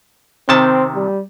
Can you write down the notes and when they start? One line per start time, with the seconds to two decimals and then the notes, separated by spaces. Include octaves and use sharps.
0.49 C3 D#3 C4 A5
0.95 G3